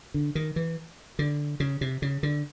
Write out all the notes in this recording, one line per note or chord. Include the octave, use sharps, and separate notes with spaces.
D3
D#3
E3
D3
C#3
C3
C#3
D3